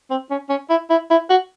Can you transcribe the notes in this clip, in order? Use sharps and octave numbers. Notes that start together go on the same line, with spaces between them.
C4
C#4
C#4
E4
E4
E4
F#4